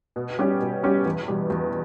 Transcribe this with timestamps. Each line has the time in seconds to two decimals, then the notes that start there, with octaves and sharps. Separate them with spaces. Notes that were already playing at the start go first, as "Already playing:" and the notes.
0.16 B2
0.39 G3 C#4 G4
0.61 B2
0.83 G3 C#4 G4
1.06 E2
1.28 B2 G3
1.50 E2